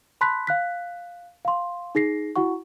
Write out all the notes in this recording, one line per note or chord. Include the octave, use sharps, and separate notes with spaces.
A5 B5 C6 F#6 B6
F5 F#6 B6
F5 C6
D#4 G#4 A#6 C7
E4 F#4 F#5 C#6